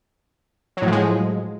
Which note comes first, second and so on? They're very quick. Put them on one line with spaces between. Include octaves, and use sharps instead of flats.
F#3 A2 F3 G#3